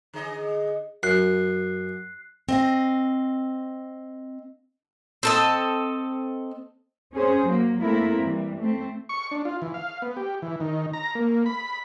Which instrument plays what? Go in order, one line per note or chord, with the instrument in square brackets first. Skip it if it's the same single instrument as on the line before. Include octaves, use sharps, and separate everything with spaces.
[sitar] D3 G#4 D#5
[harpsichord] F#2 [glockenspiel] F#6 C7
[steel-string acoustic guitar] C4 D#5 F5
[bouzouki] C4 A4 D#5
[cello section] C#4 G#4 C5
F#3 A#3
A3 A#3 C4 E4 A#4
E3 G3
A3 C4
[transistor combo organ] C#6
D4
F4
E3
F5
B3
G4
E3
D#3
A#5
A#3
B5